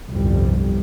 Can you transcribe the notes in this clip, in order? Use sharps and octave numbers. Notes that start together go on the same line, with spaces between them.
G1 C2 F2 G3